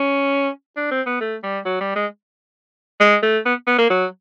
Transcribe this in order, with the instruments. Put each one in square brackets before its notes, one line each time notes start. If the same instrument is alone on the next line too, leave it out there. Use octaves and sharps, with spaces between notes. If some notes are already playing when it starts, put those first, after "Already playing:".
Already playing: [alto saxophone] C#4
D4
C4
B3
A3
G3
F#3
G3
G#3
G#3
A3
B3
B3
A#3
F#3